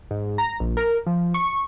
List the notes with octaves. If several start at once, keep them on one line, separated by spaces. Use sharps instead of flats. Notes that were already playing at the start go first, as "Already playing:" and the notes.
G#2
A#5
A#1
A#4
F3
C#6